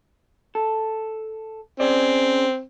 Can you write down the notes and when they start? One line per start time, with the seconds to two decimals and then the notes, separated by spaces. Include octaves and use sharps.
0.55 A4
1.80 C4 C#4 G#4 D5